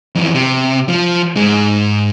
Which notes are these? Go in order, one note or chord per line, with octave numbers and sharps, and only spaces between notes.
F2 E3
C3
F3
G#2 G#3